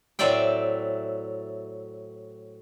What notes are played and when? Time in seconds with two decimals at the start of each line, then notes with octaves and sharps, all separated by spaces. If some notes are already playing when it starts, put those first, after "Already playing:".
0.19 A2 F#3 C4 D5 E5 G5